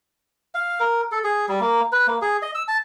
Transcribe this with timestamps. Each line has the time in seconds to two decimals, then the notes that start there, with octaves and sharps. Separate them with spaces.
0.55 F5
0.80 A#4
1.12 A4
1.24 G#4
1.48 G3
1.61 A#3
1.92 B4
2.07 A#3
2.22 G#4
2.42 D#5
2.55 E6
2.68 A5